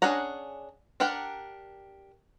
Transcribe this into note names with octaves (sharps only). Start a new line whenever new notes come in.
C#4 D4 G#4 F#5 A#5
D4 G4 A#4 F#5 G5